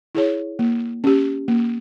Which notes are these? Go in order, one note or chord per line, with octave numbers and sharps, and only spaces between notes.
E4 G#4 C#5
A#3
C#4 G4
A#3